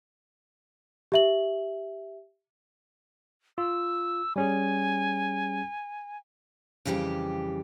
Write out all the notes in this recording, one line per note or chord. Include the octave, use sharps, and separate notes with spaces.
G4 E5 F#7
F4 E6
G3 C#4 G#4 G#5
F2 C#3 E3 G3 G4 G5